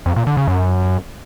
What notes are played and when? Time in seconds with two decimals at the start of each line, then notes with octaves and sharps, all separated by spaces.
0.06 F2
0.16 A#2
0.27 D3
0.37 C#3
0.48 F#2